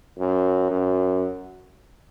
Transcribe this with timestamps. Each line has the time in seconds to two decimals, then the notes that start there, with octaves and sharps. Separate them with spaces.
0.19 F#2
0.71 F#2